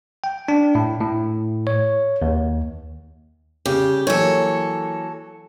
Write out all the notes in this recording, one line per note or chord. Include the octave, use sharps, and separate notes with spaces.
G5
D4
A2
A2
C#5
D#2
C#3 G3 G4
E3 F#3 A#3 A4 C#5